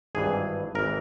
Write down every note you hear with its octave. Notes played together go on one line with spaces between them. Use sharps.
G#1 G2 E3 G#4
G#1 E3 A#4